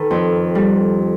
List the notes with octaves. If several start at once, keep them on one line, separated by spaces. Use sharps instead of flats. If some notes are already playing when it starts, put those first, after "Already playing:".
Already playing: D#3 A4 B4
F2
G3